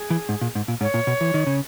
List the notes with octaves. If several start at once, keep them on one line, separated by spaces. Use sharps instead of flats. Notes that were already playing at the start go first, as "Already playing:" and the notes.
Already playing: G#4
E3
G#2
A#2
G#2
A#2
G#2 C#5
A#2
B2
E3
D#3
C#3